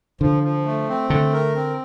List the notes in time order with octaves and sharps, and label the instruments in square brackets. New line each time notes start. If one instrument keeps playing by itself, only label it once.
[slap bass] D3 [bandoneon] F3
[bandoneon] F3
A3
C4
[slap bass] D3 [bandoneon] A3
[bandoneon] A#4
C4